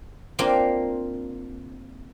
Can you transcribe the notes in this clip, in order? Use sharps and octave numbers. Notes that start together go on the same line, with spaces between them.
A#3 C4 D4 F4 C5